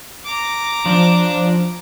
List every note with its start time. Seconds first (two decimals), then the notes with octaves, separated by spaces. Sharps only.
0.25 A#5 D6
0.86 F3 D4